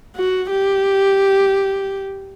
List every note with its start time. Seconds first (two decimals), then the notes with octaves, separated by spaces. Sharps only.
0.16 F#4
0.50 G4